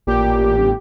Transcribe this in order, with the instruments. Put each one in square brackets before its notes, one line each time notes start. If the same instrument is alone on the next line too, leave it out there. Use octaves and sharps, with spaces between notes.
[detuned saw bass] A1 [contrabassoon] A#2 [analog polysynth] G4
[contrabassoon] G1